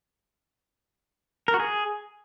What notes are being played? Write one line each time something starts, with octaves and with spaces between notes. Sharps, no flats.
A#4
F#4
G#4